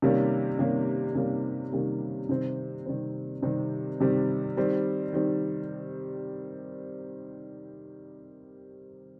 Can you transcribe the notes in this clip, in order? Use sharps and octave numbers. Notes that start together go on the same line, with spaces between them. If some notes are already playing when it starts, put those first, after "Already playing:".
C3 D#3 G3 A#3 C#4
C3 D#3 G3 A#3 C#4
C3 D#3 G3 A#3 C#4
C3 D#3 G3 A#3 C#4
C3 D#3 G3 C4
C3 D#3 G3 C4
C3 D#3 G3 C4
C3 D#3 G3 C4
D#3 G3 C4
D#3 G3 C4